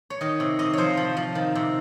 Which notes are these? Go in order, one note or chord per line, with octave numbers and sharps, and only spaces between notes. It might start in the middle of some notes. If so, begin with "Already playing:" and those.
C#5
D#3 D#5
C3
C3 D#5
F3 C5 C#5
F3
F3
D#3
C3